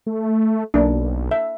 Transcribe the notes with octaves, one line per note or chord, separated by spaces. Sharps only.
A3
B1 A#3 D4
E5